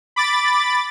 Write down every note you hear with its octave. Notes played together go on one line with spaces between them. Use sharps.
B5 D6 A6